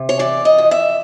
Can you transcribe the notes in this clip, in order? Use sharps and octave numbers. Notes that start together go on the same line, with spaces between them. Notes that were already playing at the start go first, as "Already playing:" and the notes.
Already playing: C3
C#5
E3 D5
D#5
F2
E5